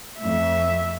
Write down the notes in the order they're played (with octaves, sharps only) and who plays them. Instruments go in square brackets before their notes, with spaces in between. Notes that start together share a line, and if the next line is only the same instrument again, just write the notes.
[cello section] F2 A3 [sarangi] E5